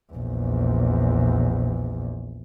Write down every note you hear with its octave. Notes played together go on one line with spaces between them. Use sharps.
A#1 E2